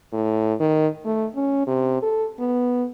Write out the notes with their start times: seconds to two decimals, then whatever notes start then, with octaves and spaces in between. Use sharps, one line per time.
0.13 A2
0.59 D#3
1.05 A3
1.36 C#4
1.67 C3
2.02 A4
2.39 B3